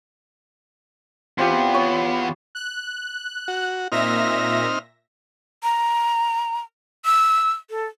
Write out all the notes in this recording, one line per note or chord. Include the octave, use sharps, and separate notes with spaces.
E2 B3 C4 F4 G4
C#5
F#6
F#4
A#2 C4 D#4 E5 F6 A#6
A#5
E6
A4